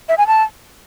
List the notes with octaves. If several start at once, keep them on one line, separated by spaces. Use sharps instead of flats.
E5
G#5
A5